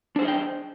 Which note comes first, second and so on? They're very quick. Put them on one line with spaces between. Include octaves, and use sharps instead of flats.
D4 C5 G#4 D#5 G5